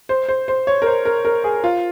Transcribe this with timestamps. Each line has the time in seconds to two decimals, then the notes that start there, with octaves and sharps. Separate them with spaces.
0.09 C5
0.28 C5
0.48 C5
0.67 C#5
0.82 A#4
0.86 C5
1.05 A#4
1.25 A#4
1.44 G#4
1.64 F4